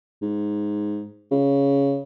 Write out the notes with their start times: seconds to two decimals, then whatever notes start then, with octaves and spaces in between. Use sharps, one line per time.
0.22 G#2
1.31 C#3